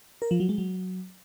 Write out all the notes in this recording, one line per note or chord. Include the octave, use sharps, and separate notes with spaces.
A#4
F3
F#3
G#3
F#3